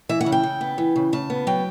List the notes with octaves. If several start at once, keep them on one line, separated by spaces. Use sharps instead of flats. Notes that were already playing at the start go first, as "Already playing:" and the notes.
E3 E5
F#5
C#3
G5
C#3
B3
E3
C#3
C#3 A5
B3
F#3 G5